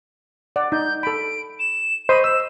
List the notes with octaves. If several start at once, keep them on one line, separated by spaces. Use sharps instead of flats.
D5 F#5
D#4 G6
A4 B5 D7
E7
C5 D#5 B5 C#6 D#7
E6 E7